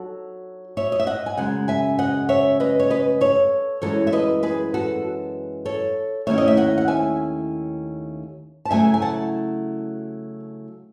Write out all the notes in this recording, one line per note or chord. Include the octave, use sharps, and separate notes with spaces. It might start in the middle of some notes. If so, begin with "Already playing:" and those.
Already playing: F#3 D#4 F#4 A4
C#5 E5
D#5
E5
D#5 F#5
G#5
F#2 C#3 G#3 F#5
E5 G#5
D#5 F#5
C#5 E5
B4 D#5
C#5
B4 D#5
A4 C#5
F#2 E3 G#3 A4 C#5
E5
B4 D#5
G#4 B4
F#4 A4
A4 C#5
D#2 D#3 A3 C#4 E4 C#5 E5
D#5
E5
D#5 F#5
F#5
E5 G#5
A5
C#3 F#3 A3 E4 E5 G#5
G#5
F#5 A5